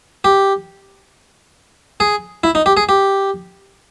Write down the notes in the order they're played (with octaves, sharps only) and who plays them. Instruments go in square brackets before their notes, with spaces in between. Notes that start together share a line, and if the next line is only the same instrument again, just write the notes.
[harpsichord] G4
G#4
E4
D#4
G4
G#4
G4